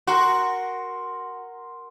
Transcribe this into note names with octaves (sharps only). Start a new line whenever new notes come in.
F#4 A#4 C6